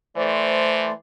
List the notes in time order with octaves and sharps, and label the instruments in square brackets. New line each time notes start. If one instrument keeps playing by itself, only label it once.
[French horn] E3 [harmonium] A3 C5 D5